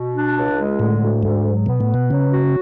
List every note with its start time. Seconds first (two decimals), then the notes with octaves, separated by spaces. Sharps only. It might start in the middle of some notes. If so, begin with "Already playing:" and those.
Already playing: B2
0.14 D4
0.37 C#2
0.58 G#3
0.79 A2 D3
1.01 D2
1.23 D2 G#2
1.45 F#3
1.66 B2 B3
1.81 A2
1.89 B4
1.94 B2
2.10 C#3 F#3
2.32 F#4